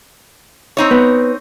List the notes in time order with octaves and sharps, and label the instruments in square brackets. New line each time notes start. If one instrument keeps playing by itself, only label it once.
[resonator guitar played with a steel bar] C4 D#4 C#5
[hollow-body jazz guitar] B3